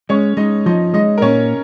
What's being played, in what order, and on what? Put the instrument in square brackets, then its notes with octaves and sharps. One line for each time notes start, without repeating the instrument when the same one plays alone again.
[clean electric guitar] G#3 [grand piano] C#4 C#5
[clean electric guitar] G#3 [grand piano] D#4 D#5
[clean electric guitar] F3 [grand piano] D#4 D#5
[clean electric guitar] G#3 [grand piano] D#4 D#5
[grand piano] A#4
[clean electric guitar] A#2 [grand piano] C#4 C#5